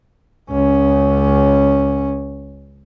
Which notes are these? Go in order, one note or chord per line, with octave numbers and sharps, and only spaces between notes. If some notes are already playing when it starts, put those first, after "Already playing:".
C#2 C#4